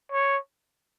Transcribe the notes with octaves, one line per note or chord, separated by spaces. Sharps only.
C#5